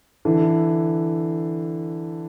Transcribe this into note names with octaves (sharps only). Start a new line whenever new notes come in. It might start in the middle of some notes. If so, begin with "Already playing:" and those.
D3 E3